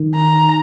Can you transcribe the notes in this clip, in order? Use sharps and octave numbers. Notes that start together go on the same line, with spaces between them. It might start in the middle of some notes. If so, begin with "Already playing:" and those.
Already playing: D#3
A#5